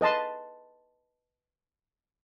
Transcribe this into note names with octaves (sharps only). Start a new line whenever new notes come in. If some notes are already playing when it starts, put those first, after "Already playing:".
B4 D#5 A5 C6